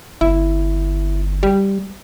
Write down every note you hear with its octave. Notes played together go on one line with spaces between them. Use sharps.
G1 E4
G3